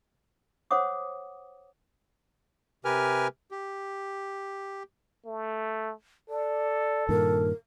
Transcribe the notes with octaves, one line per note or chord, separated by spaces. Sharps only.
C5 C#5 F#5 D6 D#6
C3 G4 A#4 B4 G#5 F6
G4
A3
A4 D5
G2 A#2 D#3 A#4